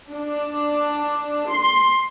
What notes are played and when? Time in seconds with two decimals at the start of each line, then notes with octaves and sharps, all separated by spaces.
0.13 D4
1.51 C6